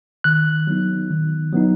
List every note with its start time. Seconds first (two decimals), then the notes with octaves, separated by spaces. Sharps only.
0.24 D#3 F#6
0.67 F#3 B3 D#4
1.10 D#3
1.53 F#3 B3 D#4